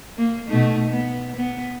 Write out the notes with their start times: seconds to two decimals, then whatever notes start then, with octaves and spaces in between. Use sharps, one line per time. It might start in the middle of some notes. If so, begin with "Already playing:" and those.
0.17 A#3
0.48 B2 A3 D#4
0.90 B3
1.36 B3